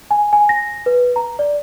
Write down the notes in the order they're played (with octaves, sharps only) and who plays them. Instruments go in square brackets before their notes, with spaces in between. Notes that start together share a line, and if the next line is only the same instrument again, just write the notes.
[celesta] G#5
G#5
A#6
B4
A#5
D5